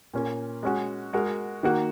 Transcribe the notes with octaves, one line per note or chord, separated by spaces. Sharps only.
A#2 A#3 C#4 A#4
G#3 C#4 F#4
G#3 F#4 A#4
D#3 A#3 F#4